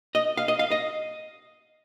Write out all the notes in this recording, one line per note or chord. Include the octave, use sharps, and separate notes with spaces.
D#5
F5
D#5
F5
D#5